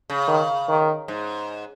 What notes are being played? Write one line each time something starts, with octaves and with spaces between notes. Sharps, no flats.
C#3
D#3
D#3
G#2